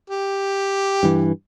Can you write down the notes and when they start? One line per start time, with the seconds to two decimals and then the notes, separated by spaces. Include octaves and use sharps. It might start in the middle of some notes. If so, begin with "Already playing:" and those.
0.10 G4
1.03 G2 E3